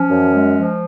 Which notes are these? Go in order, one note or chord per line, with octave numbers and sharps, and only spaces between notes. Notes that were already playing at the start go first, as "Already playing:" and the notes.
Already playing: F3 C#4
F#2
G#3
F3